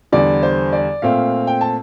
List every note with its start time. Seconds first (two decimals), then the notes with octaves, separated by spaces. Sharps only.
0.12 E2 D3 G3 D5
0.43 C5
0.72 D5
1.02 A#2 A3 C4 F5
1.47 G5
1.61 A5